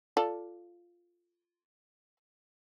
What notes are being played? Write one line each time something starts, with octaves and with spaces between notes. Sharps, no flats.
F4 A4 D5